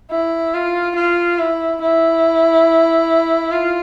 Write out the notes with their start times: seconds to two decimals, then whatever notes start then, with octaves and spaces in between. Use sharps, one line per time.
0.11 E4
0.54 F4
0.96 F4
1.39 E4
1.82 E4
3.51 F4